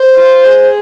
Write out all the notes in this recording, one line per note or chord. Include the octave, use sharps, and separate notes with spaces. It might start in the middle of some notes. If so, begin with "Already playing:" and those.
Already playing: C5
F4
G#4